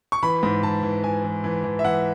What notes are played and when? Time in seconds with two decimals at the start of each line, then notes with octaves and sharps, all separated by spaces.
0.12 C#6
0.23 E3 B5
0.43 G#2
0.63 E3 A5
0.83 E3
1.04 E3 G#5
1.24 E3
1.44 E3
1.64 E3
1.79 E5
1.84 E3 F#5